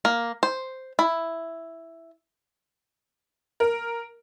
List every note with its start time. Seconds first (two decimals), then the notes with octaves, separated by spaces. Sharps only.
0.05 A#3
0.43 C5
0.99 E4
3.60 A#4